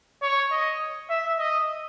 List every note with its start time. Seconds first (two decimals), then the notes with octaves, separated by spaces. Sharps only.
0.22 C#5
0.52 D#5
1.10 E5
1.39 D#5